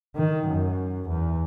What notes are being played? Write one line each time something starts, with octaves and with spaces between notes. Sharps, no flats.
D#3
F#2
E2